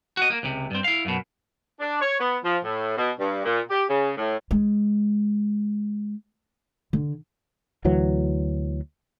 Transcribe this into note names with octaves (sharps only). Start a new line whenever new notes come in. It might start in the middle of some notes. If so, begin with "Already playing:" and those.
F#4 D#5
A#3
C#2 C3
G2 C4
E4 F5
F#2 B2
D4
C#5
B3
F3
A2
B2
G2
A#2
G4
C#3
A2
G#3
D3
D2 E3 F#3